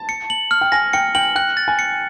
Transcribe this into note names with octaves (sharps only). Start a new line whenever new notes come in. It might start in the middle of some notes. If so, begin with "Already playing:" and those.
Already playing: A5
C#7
F#7
F6
G5
G#5 A#6
G5 C#7
G5 F#7
G5 F#6
A6
G#5
C#7